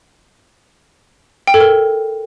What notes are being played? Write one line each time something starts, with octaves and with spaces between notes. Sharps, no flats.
G5
A4
A#4